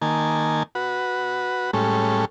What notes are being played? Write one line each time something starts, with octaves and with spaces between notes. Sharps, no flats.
D#3 A#3 G#5 A5
F#4 B4
A2 G3 G#3 C#4 A4